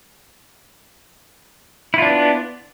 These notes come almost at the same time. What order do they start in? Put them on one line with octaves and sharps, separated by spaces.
E4 F4 D4 B3